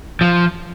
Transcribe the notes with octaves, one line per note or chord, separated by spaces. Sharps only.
F3